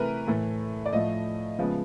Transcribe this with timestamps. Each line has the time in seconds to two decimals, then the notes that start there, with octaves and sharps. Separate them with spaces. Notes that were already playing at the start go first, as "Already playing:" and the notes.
Already playing: C3 E3 A3 A#4 B4
0.27 A2 E3 A3
0.86 D5
0.93 A2 F3 A3 D#5
1.59 C#3 F3 G#3 B3